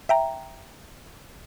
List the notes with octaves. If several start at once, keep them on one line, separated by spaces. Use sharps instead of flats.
E5 G5 A#5